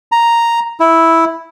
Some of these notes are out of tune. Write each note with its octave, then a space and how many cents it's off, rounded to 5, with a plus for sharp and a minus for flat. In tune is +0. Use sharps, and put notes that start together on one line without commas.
A#5 +0
E4 -5